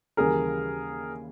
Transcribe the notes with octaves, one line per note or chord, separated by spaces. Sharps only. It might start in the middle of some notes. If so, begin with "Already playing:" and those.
D#2 C#3 E3 G3 G#4 A#4